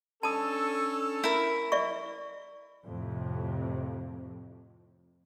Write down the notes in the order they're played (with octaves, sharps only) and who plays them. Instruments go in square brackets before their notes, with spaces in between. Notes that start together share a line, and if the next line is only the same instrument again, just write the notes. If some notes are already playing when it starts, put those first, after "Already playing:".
[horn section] C#4 D4 A4 [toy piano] A5 D#6
[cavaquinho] E4 A#4
[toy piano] D5 E5 C#6
[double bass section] F2 A2 C3